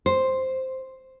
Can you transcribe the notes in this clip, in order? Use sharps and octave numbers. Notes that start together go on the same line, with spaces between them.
C5